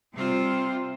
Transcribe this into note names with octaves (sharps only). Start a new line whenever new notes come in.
C3 G3 C4 F4 C5